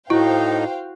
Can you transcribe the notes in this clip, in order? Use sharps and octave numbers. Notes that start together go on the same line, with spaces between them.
A2 D#4 E4 F#4 C5 F5 G5